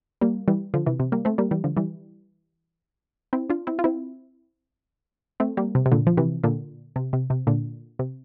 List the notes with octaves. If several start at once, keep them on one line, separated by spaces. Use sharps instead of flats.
G3 A#3
E3 G3
D3 F3
C3 E3
C3
G3 A#3
A3 C4
G3 A#3
E3 G3
D3 F3
E3 G3
C4 E4
D4 F4
C4 E4
F4
C4 E4
A3 C4
G3 A#3
C3
C3
A#2 D3
F3
C3 E3
A#2 D3
C3
C3
C3
A#2 D3
C3